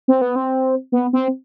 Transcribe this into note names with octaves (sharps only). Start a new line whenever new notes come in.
C4
B3
C4
B3
C4